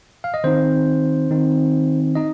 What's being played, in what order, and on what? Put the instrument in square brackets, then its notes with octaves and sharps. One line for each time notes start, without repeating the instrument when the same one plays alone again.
[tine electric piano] F5
D#5
D#3 C4 D#4 C5
D#3 C4 D#4
D#4 D#5